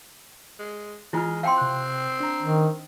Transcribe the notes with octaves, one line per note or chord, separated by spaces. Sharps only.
G#3
E3 G#3 E4 F4 G#5 F6
C4 F5 G5 C6
C3 F#6
D4 A#5
D#3